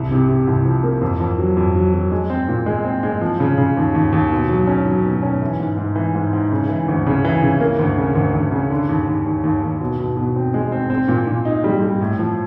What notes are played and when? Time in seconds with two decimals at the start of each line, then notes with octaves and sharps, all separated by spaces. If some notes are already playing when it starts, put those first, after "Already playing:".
Already playing: C2
0.11 C3
0.29 C3
0.47 C2
0.65 F3
0.83 A#3
1.01 F2
1.20 F2
1.38 F#3
1.57 F2
1.76 F#3
1.94 F#3
2.11 G#3
2.30 C4
2.48 A#2
2.66 G#3
2.85 C4
3.03 G#3
3.21 F3
3.40 C#3
3.58 C#3
3.77 D#2
3.95 D#2
4.13 D#2
4.32 B2
4.49 F#3
4.67 C#4
4.86 F#3
5.05 B2
5.23 C#4
5.42 E3
5.60 G#2
5.78 G#2
5.96 E3
6.15 G#2
6.33 G#2
6.52 C#3
6.69 E3
6.88 D2
7.06 C#3
7.25 E3
7.42 C#3
7.60 A#3
7.79 D2
7.98 C#3
8.15 D2
8.34 D2
8.52 C#3
8.70 D3
8.89 D#2
9.08 D#2
9.26 D#2
9.44 D#2
9.62 D#2
9.80 B2
9.99 B2
10.17 B2
10.36 C4
10.54 G#3
10.72 C4
10.90 C4
11.08 A#2
11.27 A#2
11.45 D#4
11.64 G3
11.82 G3
12.01 A2
12.19 F3